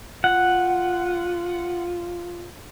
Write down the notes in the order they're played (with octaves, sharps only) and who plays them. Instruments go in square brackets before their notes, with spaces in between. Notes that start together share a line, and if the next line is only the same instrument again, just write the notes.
[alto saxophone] F4 [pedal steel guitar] F#5